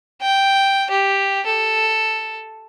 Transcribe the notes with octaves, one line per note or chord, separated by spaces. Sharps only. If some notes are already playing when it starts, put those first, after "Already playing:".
G5
G4
A4